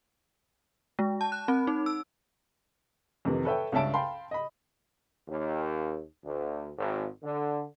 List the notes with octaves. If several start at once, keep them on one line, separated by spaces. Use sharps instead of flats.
G#3
A5
F#6
C4
D#4
E6
F2 C3 D#3 E3
A4 B4 C#5 E5 G5
C#2 G2 C#4 E5 A5 D7
F5 G5 A5 B5 C6
D#5 B5
D#2
D2
G#1
D3